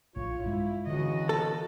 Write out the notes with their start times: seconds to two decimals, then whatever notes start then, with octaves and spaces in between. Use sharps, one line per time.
0.16 A#1 A2 F4 C#5
0.44 G2 G3 G#3 E4
0.87 C#2 D3 E3 F#4 D#5
1.29 A4